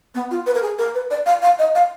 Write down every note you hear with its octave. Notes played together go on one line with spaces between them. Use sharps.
B3
F4
B4
A#4
G#4
A#4
B4
D5
F5
F5
D#5
F5